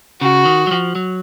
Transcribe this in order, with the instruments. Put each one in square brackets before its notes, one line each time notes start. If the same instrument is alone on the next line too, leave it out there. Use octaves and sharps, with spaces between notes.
[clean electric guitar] C#3 [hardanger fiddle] F#4
[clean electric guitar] D#3
F#3
F3
F#3